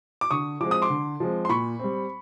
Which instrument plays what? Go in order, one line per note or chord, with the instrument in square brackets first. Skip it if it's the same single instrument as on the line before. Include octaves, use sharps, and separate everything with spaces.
[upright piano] D6
D3 C#6 D#6
F3 G#3 C4 D6
D#6
C6 D6
D3
F3 G#3 C4
C6
A#2 B5 C#6
G3 C4